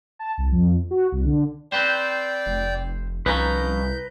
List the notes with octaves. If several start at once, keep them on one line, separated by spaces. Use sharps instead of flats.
A5
C2
F2
F#4
C2
D3
C4 B4 C5 D5 G5
F1
C2 F3 C#4 D#4 B4 A#5 G6